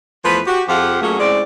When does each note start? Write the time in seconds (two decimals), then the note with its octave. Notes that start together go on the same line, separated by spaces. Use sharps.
0.25 E2 F3 A3 B4
0.47 F#4 G4
0.69 F2 F3 F4 G4 G#4 F#5
1.01 F#3 A3 A#3 C#4 F4 G#4
1.19 A2 G#3 C4 C#4 D5